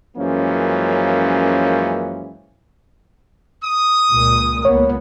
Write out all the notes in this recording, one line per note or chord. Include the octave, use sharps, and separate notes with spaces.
F#2 E3 F3 G#3 A#3 C#4
D#6
C#2 A#2
C#2 A#3 B3 C#5